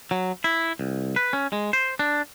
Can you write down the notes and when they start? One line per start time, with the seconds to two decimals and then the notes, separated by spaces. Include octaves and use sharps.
0.11 F#3
0.44 E4
0.79 C2
1.16 B4
1.33 C#4
1.52 G#3
1.73 C5
1.99 D4